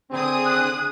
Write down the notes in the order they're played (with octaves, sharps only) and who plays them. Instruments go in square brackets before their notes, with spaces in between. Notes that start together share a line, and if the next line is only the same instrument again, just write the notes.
[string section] D3 G#4 D#6 [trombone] C4
[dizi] F#6